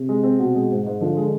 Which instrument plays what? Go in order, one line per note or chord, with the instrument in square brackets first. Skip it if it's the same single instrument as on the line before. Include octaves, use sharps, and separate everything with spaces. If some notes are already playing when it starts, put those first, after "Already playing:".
Already playing: [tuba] C3
[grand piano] G#3
C4
B2
G#3
G#2
G#2
[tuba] D3 [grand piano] F3
[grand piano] G#3